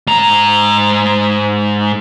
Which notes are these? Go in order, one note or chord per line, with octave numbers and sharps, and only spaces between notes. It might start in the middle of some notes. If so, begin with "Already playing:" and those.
G#2 A#5